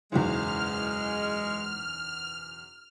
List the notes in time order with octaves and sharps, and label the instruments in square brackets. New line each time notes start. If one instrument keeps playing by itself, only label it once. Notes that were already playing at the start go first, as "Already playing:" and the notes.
[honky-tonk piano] F#1 B1 E2 [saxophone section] G#3 [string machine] F6